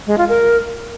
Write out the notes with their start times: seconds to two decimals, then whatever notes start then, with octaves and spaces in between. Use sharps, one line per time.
0.07 G#3
0.18 F4
0.29 A#4